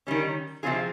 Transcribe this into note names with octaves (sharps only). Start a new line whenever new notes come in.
D#3 G3 C#4
C3 F3 C4 F4 G#4